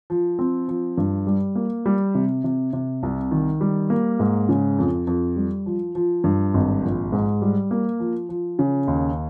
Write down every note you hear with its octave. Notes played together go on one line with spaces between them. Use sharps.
F3
C4
F3
G2
G3
A#3
G3
C3
C3
C3
C2
D#3
G3
A#3
G#2
C#3
F2
F2
G3
F3
F3
G2
G#1
A#1
G#2
G3
A#3
F3
F3
C#3
D#2